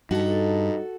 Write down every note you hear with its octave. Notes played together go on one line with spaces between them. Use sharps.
G2 D#4 F#4 A4